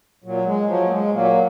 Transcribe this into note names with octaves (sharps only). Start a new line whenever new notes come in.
A#2 F#3
G#3
F3 F#3
A#3
G#3
A#2 F#3 A#3